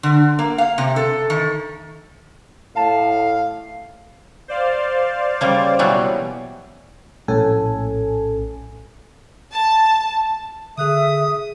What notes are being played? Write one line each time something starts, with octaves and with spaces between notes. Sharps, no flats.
D3
A#3
F5
C3
A4
D#3
A2 F5 A5
C5 D5 F5
C#3 G3 A#3
B2 E3 F#3 G3
A#1 A2 C#4 A4 G#5
A5
D3 G#4 E5 D#6 F#6 D#7